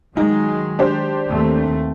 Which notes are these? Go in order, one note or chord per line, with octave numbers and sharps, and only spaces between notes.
D#3 F#3 G#3 D#4
D4 G4 C5
D#2 A3 C4